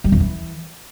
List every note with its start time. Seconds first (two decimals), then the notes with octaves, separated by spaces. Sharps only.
0.04 G3
0.12 E2
0.20 E3